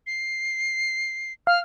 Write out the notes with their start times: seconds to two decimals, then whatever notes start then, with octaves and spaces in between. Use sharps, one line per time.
0.07 C7
1.47 F5 F6